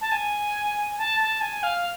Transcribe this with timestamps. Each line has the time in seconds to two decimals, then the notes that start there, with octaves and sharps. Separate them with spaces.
0.01 A5
0.12 G#5
0.98 A5
1.20 A5
1.41 G#5
1.63 F5